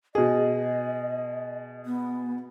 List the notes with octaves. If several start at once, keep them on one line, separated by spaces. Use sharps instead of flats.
B2 G#4 D#5
B3